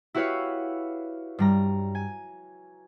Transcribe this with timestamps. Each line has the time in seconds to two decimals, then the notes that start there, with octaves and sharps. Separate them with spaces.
0.14 E4 F#4 G4 B4 C#5 F5
1.39 G2 G3 A#5
1.95 G#5